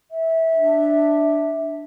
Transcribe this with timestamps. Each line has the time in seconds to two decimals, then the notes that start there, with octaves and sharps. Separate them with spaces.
0.11 E5
0.55 D4